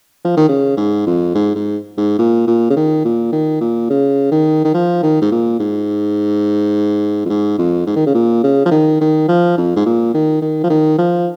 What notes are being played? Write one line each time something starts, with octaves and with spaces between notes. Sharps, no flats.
F3
D#3
C#3
G#2
F2
G#2
G#2
G#2
A#2
A#2
C#3
D#3
A#2
D#3
A#2
C#3
D#3
D#3
F3
D#3
G#2
A#2
G#2
F2
G#2
F2
G#2
D#3
C#3
A#2
C#3
F3
D#3
D#3
F3
F2
G#2
A#2
D#3
D#3
F3
D#3
F3